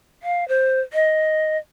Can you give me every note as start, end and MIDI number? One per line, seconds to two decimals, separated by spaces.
0.23 0.47 77
0.48 0.80 72
0.93 1.58 75